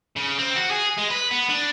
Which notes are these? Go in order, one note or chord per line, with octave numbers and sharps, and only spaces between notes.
C#3
C4
F#4
G#4
G#3
B4
B3
D4